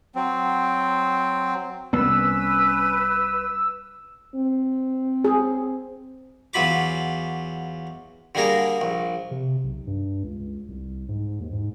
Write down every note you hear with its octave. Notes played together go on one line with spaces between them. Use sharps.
F#3 C4
C2 B3 C#4 B4 E6
C4
G#4
E2 F#3 F4 B5 D6
D3 G3 A#3 G#4 A#4
A#1
C3
B1
G2
C#2
C2
G#2
D#2
G#2